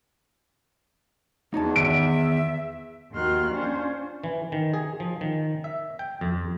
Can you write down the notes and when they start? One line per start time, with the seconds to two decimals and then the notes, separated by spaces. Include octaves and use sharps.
1.54 E2 D#4 C#5 A5
1.76 D#3 E5 D7
3.12 D#2 D#3 F#4 C6 F6 F#6
3.51 C#4 D4 F4 C5
4.24 E3
4.52 D#3
4.74 G#4
5.00 F3
5.21 D#3
5.64 E5
5.99 G5
6.21 F2